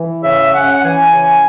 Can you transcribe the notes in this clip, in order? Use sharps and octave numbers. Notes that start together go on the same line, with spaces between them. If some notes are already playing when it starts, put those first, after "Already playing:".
Already playing: E3
C#3 E5
C#4 F#5
F#5
E3 G#5
C#3